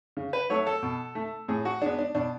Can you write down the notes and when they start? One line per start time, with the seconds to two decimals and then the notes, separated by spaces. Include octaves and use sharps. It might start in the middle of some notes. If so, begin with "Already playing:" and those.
0.17 C#3
0.33 B4
0.50 F#3 A3 C#5
0.67 A4
0.82 B2
1.15 A3
1.48 A2 G#4
1.65 F#4
1.82 G#3 B3 D4
1.98 D4
2.15 B2 D4